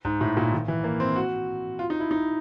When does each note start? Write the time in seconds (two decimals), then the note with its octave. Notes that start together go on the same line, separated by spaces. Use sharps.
0.05 G#2
0.21 A2
0.37 A#2
0.53 D#3
0.68 E3
0.84 A#3
1.00 C4
1.16 F#4
1.79 F4
1.90 D#4
2.00 E4
2.11 D#4